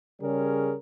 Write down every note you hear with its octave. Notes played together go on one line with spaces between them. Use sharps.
C#3 G3 C#4 G#4 A#4